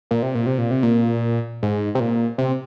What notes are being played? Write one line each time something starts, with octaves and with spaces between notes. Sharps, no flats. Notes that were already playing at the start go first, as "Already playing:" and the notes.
A#2
C3
A#2
C3
A#2
C3
A#2
G#2
C3
A#2
C3